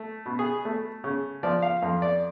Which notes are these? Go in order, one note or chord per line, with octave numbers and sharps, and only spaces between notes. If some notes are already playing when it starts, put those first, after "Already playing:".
Already playing: A3
B2
G#4
A3
C#3
F3 D5
F5
F2 F5
D5